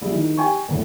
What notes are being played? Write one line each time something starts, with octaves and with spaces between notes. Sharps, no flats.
A#1 G3 E4 G#4
D#3
G4 G5 G#5 C#6
F#1 E2 A2